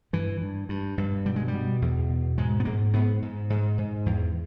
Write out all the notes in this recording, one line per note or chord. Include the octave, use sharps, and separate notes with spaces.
G2 E3
G2
G2
G2
B2 G3
G#3
G3
B2
E2
B2
G#2 G#3
B3
G#2 A#3
G#2 B3
G#2
G#2
G#2
E2